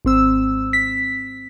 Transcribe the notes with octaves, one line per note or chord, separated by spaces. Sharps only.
G#1 C4 E6
B6